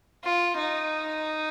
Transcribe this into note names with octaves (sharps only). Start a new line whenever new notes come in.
F4
D#4